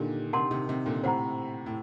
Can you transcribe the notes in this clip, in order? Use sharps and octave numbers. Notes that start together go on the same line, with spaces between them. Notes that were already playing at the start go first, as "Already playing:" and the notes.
Already playing: A#2 D3 D#3 D4 G4
C3 D#3 A#4 F#5 A5 C6
C3 D#3
C3 D#3
A#2 D3
A2 C3 C5 F#5 A#5
A2